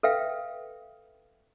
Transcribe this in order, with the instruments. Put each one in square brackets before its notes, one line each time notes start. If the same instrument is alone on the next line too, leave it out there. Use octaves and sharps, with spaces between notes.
[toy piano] A4 B4 E5 F5 G5